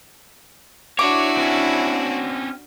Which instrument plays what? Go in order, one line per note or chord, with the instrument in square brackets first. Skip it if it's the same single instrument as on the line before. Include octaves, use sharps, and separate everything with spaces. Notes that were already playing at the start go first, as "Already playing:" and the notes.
[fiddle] D4 F#4 [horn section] E4 [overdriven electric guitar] C#5 [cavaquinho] D6
[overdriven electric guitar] C4 C#4